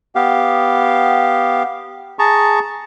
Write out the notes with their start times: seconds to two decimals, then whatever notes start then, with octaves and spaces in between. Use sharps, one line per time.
0.15 B3 G4 F5
2.19 G#4 A5 A#5 C#6